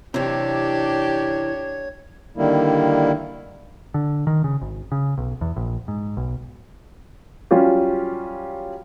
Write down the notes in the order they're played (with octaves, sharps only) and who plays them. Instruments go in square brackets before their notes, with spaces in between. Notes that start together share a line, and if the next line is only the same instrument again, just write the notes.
[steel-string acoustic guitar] F#2 E3 [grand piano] C3 [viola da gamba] D4 G4 [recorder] C#5
[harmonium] D3 D#3 G3 A#3 E4
[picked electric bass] D3
D#3
C#3
G#1
C#3
B1
E2
A#1
G#2
B1
[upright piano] F#3 G3 C#4 F4 G4